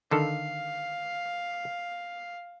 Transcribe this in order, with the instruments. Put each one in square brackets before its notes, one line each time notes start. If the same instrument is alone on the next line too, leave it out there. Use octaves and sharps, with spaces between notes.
[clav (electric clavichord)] D3 D#3 A4 [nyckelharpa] F5